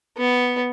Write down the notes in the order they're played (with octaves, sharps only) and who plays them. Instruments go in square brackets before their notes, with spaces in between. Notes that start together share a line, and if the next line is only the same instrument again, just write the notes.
[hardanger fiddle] B3